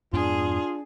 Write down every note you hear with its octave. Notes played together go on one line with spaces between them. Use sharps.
F2 G#2 B3 D4 F4 G#4